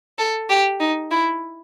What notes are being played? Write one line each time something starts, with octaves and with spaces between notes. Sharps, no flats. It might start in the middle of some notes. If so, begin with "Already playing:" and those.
A4
G4
D#4
E4